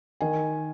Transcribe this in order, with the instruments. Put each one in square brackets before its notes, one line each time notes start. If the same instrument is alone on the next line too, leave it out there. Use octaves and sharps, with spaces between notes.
[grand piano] D#3 [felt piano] G#5